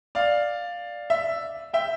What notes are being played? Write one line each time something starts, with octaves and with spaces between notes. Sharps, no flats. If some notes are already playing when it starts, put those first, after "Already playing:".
D5 F5
E5
E5 G5